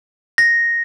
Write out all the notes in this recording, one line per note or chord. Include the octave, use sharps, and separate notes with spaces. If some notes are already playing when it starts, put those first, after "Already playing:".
A#6